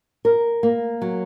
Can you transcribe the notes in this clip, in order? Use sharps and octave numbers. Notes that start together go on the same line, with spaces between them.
A#4
A#3
F#3